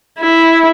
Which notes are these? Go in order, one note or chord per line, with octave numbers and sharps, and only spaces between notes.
E4